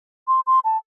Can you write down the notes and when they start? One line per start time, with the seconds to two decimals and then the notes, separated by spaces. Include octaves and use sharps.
0.28 C6
0.47 C6
0.65 A5